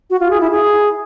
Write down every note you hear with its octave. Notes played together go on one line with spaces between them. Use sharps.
F#4
F4
G#4
E4
G#4